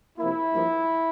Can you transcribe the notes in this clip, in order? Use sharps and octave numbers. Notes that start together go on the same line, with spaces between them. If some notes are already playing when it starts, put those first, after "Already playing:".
C3 F3 A#3 E4
G2 F3 A#3